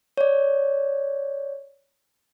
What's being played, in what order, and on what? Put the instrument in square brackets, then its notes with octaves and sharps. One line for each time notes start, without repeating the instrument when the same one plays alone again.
[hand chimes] C#5 D5